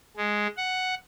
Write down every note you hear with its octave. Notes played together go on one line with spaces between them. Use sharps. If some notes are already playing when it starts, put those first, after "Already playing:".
G#3
F#5